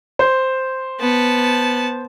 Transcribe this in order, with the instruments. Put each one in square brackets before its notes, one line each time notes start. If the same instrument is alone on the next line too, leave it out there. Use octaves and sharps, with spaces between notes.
[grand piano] C5
[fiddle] B3 A5